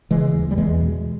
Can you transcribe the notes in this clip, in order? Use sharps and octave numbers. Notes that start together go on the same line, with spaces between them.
C#3 E3 G#3
D#2
G3
E2 E3 G#3
B2